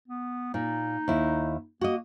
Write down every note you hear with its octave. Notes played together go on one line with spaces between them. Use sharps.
B3
A#2 D#4
D#2 E4
A#3 F#4 D#5